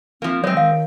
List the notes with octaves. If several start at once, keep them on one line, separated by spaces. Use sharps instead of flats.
F3 A#3 C4
F#3 G#3 C4 C#5
D#3 F5